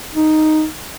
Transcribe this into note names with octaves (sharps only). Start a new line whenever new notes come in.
D#4